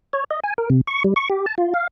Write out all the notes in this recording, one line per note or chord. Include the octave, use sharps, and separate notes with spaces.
C#5
D#5
G#5
A#4
C3
C#6
G3
C#6
G4
A5
F4
F5